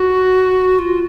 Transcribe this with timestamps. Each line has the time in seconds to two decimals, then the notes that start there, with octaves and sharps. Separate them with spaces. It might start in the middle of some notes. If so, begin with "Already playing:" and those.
Already playing: F#4
0.79 F4